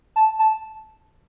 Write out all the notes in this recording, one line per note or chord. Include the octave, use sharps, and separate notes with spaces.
A5
A5